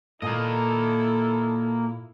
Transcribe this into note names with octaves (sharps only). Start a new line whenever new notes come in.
A#2 A#3 E4 A4 D#5